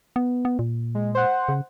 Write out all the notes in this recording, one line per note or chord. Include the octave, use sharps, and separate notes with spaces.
B3
B3
A#2
G#3
C5 F#5
C#3